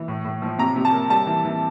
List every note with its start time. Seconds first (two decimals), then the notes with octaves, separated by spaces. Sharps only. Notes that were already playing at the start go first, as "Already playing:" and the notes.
Already playing: E3
0.08 A2
0.25 A2
0.42 F3
0.58 C3 A#5
0.76 C3
0.85 A5
0.93 A#3
1.10 G3 A5
1.27 E3
1.45 E3